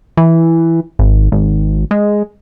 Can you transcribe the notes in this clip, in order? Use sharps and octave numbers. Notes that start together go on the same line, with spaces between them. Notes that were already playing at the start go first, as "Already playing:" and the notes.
E3
G#1
G#1
G#3